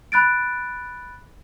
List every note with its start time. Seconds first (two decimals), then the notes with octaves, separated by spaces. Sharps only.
0.12 B5 F#6 A6 D7